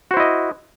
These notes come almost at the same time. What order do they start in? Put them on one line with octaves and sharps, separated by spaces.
F#4 C5 E4 D#5